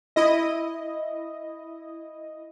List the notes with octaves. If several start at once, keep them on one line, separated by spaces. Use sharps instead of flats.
E4 D#5